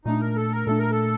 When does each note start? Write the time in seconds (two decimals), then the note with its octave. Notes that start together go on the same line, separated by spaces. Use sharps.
0.05 A#2 A3 D4 D#4
0.21 A#4
0.37 A4
0.52 A#4
0.67 A#2 A3 D4 A4
0.79 A#4
0.91 A4